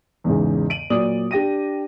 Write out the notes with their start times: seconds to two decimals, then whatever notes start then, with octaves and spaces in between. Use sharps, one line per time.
0.24 E2 G#2 C#3
0.70 D7 D#7 F#7
0.90 A#2 F#3 D5 D#6 F#7
1.31 D4 G4 A#6 D#7